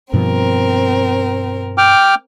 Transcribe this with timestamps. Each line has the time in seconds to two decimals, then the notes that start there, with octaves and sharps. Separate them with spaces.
0.14 G2 B2 F3 C4 A#4
1.78 G5 D6 F6